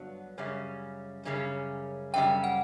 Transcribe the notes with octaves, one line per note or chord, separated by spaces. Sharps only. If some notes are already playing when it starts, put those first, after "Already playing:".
Already playing: G2 D3 F#3 B3
F#2 C#3 G3 C#4
F#2 C#3 G3 C#4
F#2 C#3 G3 G5
F#5